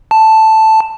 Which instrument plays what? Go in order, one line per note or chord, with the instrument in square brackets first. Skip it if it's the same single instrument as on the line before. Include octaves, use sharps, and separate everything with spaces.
[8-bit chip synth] A5